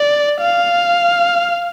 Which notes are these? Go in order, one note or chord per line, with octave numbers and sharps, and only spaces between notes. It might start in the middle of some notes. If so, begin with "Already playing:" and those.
Already playing: D5
F5